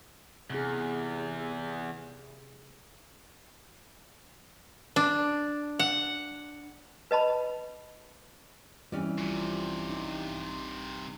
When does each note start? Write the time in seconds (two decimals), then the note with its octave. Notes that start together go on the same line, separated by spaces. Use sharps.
0.50 E2 C3 G#4
4.96 D4
5.79 F#5
7.11 B4 D#5 A5 B5
8.92 E3 G3 C4 C#4 G4 D5
9.18 A#1 G2 C3 F3
9.89 D#4